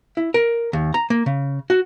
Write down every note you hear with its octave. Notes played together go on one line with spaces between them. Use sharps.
E4
A#4
D#2
A#5
A#3
C#3
F#4